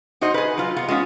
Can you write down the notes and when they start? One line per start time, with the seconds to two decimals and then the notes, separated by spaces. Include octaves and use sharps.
0.21 D#4 F#4 C5 D#5
0.34 G#4 B4
0.57 F#3 F4
0.76 B3 F4
0.88 G#3 B3 C#4 F4